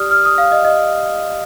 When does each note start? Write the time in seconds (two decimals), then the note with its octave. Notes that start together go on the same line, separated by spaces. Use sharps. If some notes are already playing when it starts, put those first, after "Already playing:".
Already playing: G4 D5 D#6 F6
0.11 F6
0.25 D#6
0.38 F5
0.52 D#5
0.65 D#5